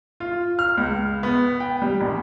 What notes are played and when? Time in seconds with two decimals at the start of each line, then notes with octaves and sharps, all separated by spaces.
0.20 F4
0.59 F6
0.78 C#2
1.23 B3
1.60 G5
1.82 G3
2.01 A#1